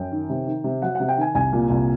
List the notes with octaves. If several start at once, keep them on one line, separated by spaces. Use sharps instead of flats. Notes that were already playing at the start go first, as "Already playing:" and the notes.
Already playing: F#2 G5
D#3
C3
D#3
C3
F#3 F#5
C3 F#5
G5
D#3 G#5
C2 G#5
A#2
C2